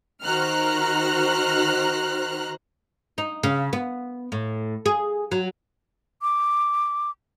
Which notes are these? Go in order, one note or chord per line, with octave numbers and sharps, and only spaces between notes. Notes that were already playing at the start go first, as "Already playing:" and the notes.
D#3 F#4 C5 A#5 F6 F#6
D#4
C#3
B3
A2
G#4
F#3
D6